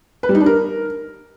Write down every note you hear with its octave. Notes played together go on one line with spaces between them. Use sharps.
B4
G3
D#4
D4
A#4